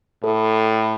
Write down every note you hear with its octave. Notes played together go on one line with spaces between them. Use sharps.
A2 A4